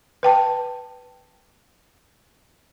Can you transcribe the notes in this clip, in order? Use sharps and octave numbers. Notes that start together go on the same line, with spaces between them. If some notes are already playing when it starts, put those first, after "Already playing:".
B4 G5 A5